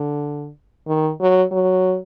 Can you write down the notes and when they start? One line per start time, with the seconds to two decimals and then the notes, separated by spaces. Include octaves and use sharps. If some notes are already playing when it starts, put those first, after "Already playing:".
Already playing: D3
0.87 D#3
1.20 F#3
1.51 F#3